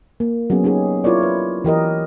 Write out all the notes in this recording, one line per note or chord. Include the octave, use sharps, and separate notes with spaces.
A#3
F#3 B3 C#4 G#4
C#4 D#4 G4 G#4
E4 F4 A#4 C#5 D5
B4
E3 G4 A#4 D#5